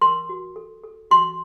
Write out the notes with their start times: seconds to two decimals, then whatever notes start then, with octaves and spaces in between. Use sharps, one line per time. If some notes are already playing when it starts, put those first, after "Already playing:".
0.01 A#4 C6
0.29 F#4
0.56 A4
0.84 A4
1.11 F#4 C6